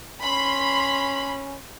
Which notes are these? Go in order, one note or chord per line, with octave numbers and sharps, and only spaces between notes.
C#4 B5 C6